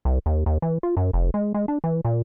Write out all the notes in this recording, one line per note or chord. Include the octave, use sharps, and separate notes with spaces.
C2
D#2
D#2
E3
F4
F#2
F1
G#3
G#3
D4
E3
A#2